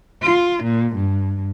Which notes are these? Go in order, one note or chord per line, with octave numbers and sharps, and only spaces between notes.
F4
A#2
G2